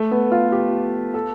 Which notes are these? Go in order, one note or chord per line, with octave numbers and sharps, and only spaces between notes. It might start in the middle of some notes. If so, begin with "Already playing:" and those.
Already playing: A3
B3
F4
G4
A4